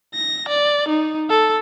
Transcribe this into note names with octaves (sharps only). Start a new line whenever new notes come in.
A#6
D5
D#4
A4